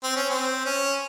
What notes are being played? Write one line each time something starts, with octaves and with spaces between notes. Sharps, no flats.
C4
C#4
C4
C#4